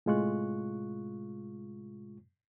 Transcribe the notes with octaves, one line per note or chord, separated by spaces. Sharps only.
A2 C3 G#3 F4 C#6 F#6